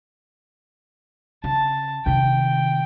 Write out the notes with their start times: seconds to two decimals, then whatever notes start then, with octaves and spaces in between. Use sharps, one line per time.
1.44 C#3 A5
2.06 C3 D#3 G5